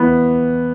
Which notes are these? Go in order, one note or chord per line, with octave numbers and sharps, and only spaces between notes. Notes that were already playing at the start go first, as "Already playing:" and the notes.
Already playing: E3 B3